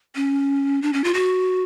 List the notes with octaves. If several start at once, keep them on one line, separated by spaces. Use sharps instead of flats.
C#4
D4
C#4
F4
F#4